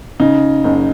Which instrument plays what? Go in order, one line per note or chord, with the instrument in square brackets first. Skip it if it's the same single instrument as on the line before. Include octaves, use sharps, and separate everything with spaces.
[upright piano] C#3 D#4
F#1